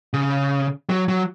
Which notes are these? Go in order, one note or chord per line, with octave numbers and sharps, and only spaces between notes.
C#3
F#3
F#3